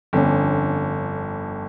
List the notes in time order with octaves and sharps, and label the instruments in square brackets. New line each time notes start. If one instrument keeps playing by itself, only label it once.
[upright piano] G1 F2 D3 C#4